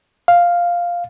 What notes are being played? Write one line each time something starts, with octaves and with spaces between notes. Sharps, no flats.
F5